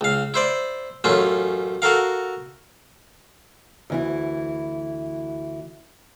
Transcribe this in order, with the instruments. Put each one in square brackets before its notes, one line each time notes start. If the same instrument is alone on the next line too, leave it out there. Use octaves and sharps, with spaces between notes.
[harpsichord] C#2 F5
E4 C5 D5
A1 F#2 A3 C#4 F4
F#4 A4 A#4 F5
[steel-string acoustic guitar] D2 E3 E4